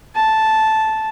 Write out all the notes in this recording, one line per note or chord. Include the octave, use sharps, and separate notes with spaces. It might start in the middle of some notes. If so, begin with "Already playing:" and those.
A5